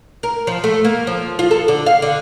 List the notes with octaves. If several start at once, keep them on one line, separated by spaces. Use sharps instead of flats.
A#4
F3
A3
A#3
F3
F4
A4
D3
F5
D3